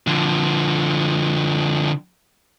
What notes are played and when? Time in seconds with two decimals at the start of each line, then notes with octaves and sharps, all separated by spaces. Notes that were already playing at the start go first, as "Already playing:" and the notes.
0.07 D3 F3